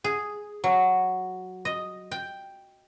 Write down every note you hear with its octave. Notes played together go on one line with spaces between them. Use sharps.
G#4
F#3
D#5
G5